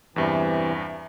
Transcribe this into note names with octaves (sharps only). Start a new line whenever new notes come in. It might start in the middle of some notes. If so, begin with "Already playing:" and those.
E2 G2 C3 E3